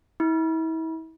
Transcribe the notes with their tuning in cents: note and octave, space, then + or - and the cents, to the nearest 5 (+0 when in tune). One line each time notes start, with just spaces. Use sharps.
E4 -40